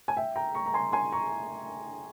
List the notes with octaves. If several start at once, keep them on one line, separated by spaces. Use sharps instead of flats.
G#5
E5 G5
G5 A#5
A#5 C#6
A#5
G#5 C6
G#5 C6
A#5 C#6